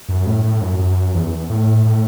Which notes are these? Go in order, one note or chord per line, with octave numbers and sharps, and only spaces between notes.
F#2
A2
A2
F#2
F#2
E2
A2
A2